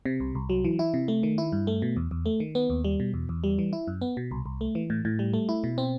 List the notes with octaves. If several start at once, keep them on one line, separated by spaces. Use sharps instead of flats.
C3
C2
C2
F#3
E3
E4
C3
A3
D#3
E4
G2
A3
B2
E2
E2
A3
D#3
B3
D#2
G3
B2
E2
E2
G3
E3
E4
F#2
B3
B2
C2
C2
A3
E3
A2
A2
G3
A3
E4
B2
C4